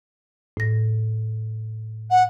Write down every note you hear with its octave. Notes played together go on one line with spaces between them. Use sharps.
A2 A#6
F#5